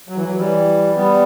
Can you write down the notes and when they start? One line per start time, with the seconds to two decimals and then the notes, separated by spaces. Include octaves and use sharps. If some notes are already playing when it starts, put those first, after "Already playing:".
0.09 F#3
0.16 E3
0.24 F#3
0.38 E3 G3
0.97 G3 B3